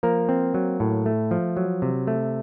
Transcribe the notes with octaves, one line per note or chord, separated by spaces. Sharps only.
F3 A#3 A#4
C4
F#3
A2
A3
F3
F#3
C3
A3